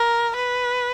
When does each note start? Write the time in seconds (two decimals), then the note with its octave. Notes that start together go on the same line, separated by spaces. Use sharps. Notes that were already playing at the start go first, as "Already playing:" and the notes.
Already playing: A#4
0.35 B4